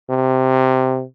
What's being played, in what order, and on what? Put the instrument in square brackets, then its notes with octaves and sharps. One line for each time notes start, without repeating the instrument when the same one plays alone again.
[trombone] C3